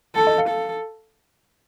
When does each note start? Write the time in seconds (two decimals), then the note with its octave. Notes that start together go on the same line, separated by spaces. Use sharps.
0.15 A4 A5
0.27 D#5
0.38 F5
0.49 A4